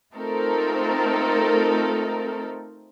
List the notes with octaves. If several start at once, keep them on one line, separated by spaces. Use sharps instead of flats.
A3 C4 D#4 F4 A4 A#4